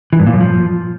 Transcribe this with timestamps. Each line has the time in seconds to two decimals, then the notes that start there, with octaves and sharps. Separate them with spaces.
0.13 E3
0.20 G2
0.27 A#2
0.34 F#2
0.41 F3